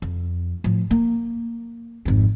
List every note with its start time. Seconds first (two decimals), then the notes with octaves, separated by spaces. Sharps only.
0.02 F2
0.64 A2 F3
0.91 A#3
2.05 G#1 F2